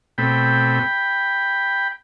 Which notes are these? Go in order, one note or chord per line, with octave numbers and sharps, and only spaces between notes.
B2 A3 C4 G5 B5